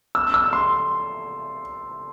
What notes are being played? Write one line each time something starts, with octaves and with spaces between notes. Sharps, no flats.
E6
E6
C6